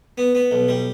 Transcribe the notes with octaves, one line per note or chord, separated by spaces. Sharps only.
B3
B3
B1
G3